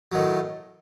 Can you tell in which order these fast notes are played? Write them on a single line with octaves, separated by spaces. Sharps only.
F#3 D#3 A2